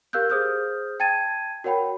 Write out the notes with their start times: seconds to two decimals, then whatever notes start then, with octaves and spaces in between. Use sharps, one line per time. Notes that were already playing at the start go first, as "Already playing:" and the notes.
0.13 G4 A#4 F5 E6 F#6 G6
0.30 G#4 C5 D#6 F6 G6
1.00 G5 A5 G#6 A6 D#7
1.64 F#4 A#4 C#5 F#5 G5 B5